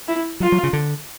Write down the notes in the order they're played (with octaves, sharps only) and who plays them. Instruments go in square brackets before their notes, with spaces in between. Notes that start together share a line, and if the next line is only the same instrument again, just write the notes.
[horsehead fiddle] E4
[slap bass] F#3 [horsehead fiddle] F4
[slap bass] F#3
C#3
D3